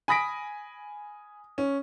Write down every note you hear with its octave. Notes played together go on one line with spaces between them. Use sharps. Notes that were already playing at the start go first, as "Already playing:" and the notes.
G#5 B5 D#6 A#6 B6 D7
C#4